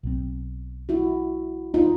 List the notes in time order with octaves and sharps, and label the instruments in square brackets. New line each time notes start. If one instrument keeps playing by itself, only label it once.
[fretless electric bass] B1 B2 G3 C4
[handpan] E4 F#4
D#4 F4